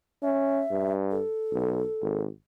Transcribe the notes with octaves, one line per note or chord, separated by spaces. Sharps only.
C#4 E5
G2
A4
B1
G#1